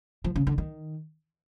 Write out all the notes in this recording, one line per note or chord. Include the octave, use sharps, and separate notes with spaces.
F3
C#3
D3
D#3